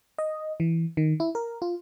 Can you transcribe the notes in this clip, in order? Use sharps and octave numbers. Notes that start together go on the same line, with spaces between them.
D#5
E3
D#3
E4
A#4
F4